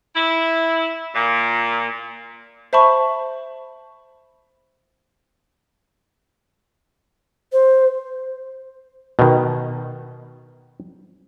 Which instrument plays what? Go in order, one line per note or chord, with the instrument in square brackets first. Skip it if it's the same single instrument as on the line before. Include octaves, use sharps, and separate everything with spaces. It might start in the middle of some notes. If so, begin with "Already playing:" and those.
[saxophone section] E4
A#2
[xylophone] C5 E5 A5 B5 C#6
[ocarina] C5
[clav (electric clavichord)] B2 D#3